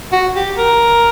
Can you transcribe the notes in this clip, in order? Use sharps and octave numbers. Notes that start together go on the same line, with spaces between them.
F#4
G4
A#4